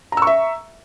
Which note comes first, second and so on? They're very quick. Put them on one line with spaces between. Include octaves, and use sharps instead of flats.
A#5 E6 C#6 E5